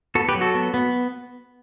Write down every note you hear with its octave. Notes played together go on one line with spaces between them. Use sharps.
B3 F#4 A4
G4 B4
F#3
F#4 A4
B3
B3